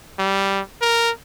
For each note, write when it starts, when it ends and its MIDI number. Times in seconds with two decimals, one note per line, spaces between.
0.19 0.61 55
0.81 1.11 70